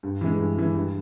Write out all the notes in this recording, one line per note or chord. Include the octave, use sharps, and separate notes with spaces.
G2
E3 G#3
G2
E3 G#3
G2